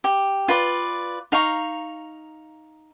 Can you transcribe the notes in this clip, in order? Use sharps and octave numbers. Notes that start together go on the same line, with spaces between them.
G4
F4 B4 D5
D#4 F5 A#5 C#6